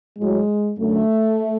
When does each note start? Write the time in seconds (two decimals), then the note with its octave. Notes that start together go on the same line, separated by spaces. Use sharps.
0.18 A2 F#3 G#3
0.78 F#2 D3 F#3 A3